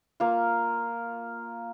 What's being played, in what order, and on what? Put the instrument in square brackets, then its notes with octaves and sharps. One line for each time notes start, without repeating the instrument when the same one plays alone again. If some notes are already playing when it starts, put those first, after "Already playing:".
[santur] A#3 F4